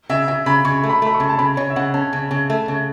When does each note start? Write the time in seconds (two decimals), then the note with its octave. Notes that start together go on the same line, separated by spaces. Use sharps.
0.09 C#3 E5
0.28 C#3 E5
0.46 C#3 B5
0.65 C#3 C#6
0.83 A3
0.89 B5
1.02 A3 B5
1.14 C#6
1.20 C#3
1.29 A5
1.39 C#3 B5
1.57 C#3 C#5
1.70 E5
1.76 C#3 F#5
1.94 C#4 A5
2.13 C#3
2.31 C#3
2.50 A3
2.68 C#3